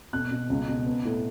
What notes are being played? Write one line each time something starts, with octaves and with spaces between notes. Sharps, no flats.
B2 F#6
B2
C#2
B2
B3
A2